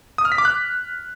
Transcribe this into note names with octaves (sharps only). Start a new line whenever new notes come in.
D#6
F6
B6
D6
F#6